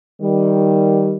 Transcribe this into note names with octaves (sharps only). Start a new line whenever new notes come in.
D#3 G3